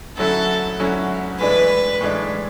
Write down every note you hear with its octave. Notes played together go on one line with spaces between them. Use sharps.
D2 D3 F#3 C#4 E4 A4
D2 D3 F#3 C#4 E4
A2 E3 G#3 D4 B4
A2 E3 G#3 D4